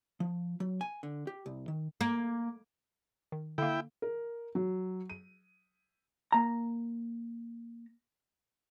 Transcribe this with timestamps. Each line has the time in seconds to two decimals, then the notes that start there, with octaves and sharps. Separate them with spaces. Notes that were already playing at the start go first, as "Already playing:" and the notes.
0.20 F3
0.60 F#3
0.81 G#5
1.03 D3
1.27 G4
1.46 C2
1.68 D#3
2.01 A#3
3.32 D#3
3.58 D3 A#3 E4 G5
4.02 A#4
4.55 F#3
5.10 D#7
6.32 A#3 A#5